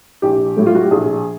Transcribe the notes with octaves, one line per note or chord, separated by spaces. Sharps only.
A#1 G4
A2 F#3 A3
F4
F#4
G4
A#1 G#4